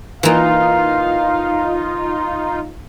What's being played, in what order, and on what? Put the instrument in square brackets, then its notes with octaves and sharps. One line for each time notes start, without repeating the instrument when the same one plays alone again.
[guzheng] E3 A#3 [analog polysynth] D#4 F4 [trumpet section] F5